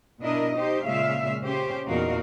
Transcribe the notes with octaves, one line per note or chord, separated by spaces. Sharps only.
B2 D4 E4 A#4 D#5
D#4 G4 C5 D#5
A#2 C#3 G#3 E5 F5
C#3 C#4 G4 C5
E2 A#2 D#4 F#4 A#4 F5